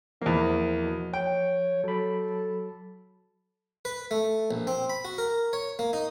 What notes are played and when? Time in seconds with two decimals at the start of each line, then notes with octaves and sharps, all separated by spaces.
0.22 E2 F3 A#3 C4
0.83 B2
1.14 C#5 G5
1.84 F#3 A4 B5
3.85 B4
4.11 A3
4.51 A#1
4.67 C4
4.90 B5
5.05 F#4
5.18 A#4
5.53 C#5
5.79 A#3
5.93 D#4